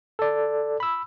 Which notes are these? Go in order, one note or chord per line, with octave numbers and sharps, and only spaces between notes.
A4 D5
B5 E6